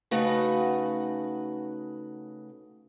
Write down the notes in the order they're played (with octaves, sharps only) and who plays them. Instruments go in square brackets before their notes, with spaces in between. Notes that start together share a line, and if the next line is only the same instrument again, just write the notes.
[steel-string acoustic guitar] C#3 A3 D#4 F#4 B4